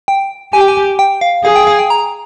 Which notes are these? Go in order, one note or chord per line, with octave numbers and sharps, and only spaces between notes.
G5
G4 G#5
G5
G#5
G5
F5
G#4 F5
G5
F5
G5
A#5